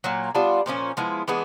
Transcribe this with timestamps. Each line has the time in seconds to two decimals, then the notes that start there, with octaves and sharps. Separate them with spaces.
0.04 A#2 F#3 A#3
0.35 G3 B3 D4 F4
0.66 A#2 F3 A3 C#4
0.97 F3 G#3 B3 E4
1.28 E3 G#3 B3 D4